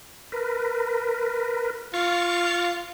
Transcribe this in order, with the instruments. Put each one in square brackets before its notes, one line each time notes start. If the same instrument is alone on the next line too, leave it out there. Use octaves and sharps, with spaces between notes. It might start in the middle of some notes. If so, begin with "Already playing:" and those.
[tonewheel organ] A#4 B4
[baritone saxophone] F4 [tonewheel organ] C#6 F6 A6